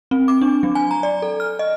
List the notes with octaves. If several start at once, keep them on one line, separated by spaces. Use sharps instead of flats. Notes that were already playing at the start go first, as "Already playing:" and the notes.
C4
D6
D4
F#3
G#5
A#5
D5
A4
F6
D#5